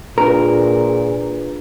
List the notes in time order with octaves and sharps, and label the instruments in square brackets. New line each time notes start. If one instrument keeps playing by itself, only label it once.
[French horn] A#2 [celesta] D4 F4 B4 [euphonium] G#4 [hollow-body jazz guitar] A#4